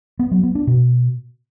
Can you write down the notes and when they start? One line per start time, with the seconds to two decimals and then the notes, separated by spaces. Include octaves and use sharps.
0.19 B3
0.31 F#3
0.43 B3
0.55 D4
0.67 B2